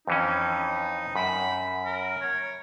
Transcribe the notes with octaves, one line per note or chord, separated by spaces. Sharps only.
F2 E3 C#4 D#4
F#2 B5
A#4
C#5